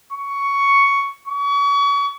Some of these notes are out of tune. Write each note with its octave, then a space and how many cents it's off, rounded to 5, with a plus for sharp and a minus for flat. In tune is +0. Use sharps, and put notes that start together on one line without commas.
C#6 +10
C#6 +35